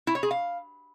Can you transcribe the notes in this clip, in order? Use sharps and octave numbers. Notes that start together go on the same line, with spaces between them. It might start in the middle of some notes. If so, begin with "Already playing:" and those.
E4
C#5
G#4
F5